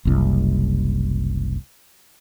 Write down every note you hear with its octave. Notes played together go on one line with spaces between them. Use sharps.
F#1 C2